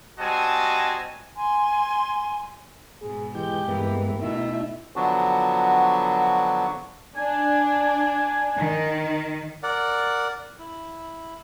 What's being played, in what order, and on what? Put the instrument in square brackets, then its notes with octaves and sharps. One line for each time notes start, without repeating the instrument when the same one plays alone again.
[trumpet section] G3 C4 F#4 D#5 G#5 A5
[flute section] G#5 C6
[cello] G#2 B2 [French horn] G#4
[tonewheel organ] E3 G6 [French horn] G#3 [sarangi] G4
[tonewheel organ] G2 G#3 B3 [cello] E3 [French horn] A#3
[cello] B2 A3 [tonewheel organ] D#4 E4 [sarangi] E5
[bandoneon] D3 F3 F#3 B3 D4 F#4
[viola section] D4 [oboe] G#5
[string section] D#3
[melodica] A#4 D5 F#5
E4